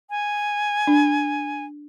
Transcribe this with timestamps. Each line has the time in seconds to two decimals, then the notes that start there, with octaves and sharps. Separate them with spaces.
0.10 G#5
0.87 D4